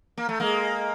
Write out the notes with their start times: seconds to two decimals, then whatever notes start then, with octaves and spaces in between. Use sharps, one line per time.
0.17 A#3
0.29 A3
0.40 G#3 A#3